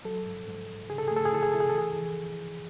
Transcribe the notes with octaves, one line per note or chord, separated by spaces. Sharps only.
F#3 A4
G#2
G#2
G#2
C#3 G#4
A4
A3 G#4
A4
G#4
E4 A4
G#4
E4 A4
G#4
A4
E3 G#4
E3